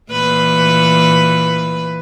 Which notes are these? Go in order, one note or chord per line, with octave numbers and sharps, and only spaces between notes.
A#2 E3 B4